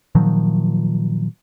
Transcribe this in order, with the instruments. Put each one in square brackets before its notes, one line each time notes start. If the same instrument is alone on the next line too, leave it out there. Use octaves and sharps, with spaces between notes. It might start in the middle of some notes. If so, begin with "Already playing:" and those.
[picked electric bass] A#2 D#3 F3 F#3